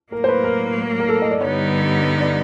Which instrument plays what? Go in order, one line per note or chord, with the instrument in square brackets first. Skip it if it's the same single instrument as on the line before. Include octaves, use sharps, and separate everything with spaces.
[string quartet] A2 F#3 A#3 [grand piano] A#4
[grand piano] C5
B4
A#4
A#4
A4
D#5
D5
[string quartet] G2 D3 G3 B3 D#4 [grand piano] C#5
[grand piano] D5